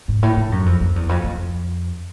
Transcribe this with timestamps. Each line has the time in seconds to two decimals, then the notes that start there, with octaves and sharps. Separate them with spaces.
0.08 G#2
0.23 A2
0.37 G#2
0.52 F#2
0.66 F2
0.81 F2
0.96 E2
1.09 F2
1.24 F2